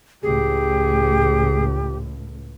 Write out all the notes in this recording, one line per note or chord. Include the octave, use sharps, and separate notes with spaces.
C#2 A2 G4 G#4